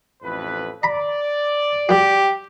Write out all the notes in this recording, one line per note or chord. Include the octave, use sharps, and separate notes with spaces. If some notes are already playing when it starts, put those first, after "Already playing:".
A1 F2 B4
D5 A#5 B5
G3 F#4 G4